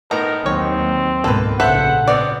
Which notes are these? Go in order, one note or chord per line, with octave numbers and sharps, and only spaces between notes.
A2 B3 D#4 A#4 A#5
D#2 D#3 F#3 C4 C#5
C#2 G#2 B2 A#3 A4 B4
A#1 C#3 B3 A4 B4 C5 E5 F#5
B2 B3 C4 D5